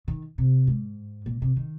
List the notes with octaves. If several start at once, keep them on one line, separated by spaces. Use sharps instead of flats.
D#3
C3
G#2
A#2
C3
D#3